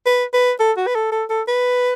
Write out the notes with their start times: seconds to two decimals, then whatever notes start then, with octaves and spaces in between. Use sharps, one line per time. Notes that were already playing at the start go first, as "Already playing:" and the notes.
0.06 B4
0.34 B4
0.60 A4
0.77 F#4
0.87 B4
0.95 A4
1.12 A4
1.30 A4
1.48 B4